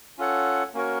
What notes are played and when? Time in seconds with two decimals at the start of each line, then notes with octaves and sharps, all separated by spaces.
0.18 C#4 F4 A4 C#5 F#5
0.74 A#3 C#4 F#4 A#4 C#5